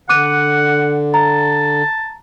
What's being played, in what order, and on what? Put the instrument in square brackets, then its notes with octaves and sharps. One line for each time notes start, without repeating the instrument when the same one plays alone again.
[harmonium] D3 [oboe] F#5 [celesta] D6 F#6 D#7
[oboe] A5 [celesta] A#5